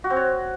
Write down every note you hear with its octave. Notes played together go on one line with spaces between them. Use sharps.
F#4
C4
C#5